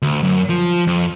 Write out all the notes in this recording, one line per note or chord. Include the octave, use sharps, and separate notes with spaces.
D2
F#2
F3
F2